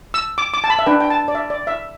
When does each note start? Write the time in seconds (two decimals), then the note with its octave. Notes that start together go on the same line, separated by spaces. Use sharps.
0.14 E6
0.38 D6
0.54 D6
0.64 A5
0.70 B5
0.79 E5
0.86 D4 B4 G5
1.01 G5
1.10 A5
1.28 D5
1.35 E5
1.50 D5
1.67 E5